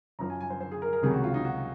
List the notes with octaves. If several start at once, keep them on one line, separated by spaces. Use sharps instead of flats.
F#2 F3 A#5
G#5
G#5
C5
C5
G#4
A#4
A#4
C#2 C3 D#3 F#3 G#4
F#4
F4
D#4
F#4